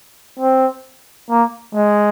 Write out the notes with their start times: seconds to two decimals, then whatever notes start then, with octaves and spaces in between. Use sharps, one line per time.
0.39 C4
1.30 A#3
1.75 G#3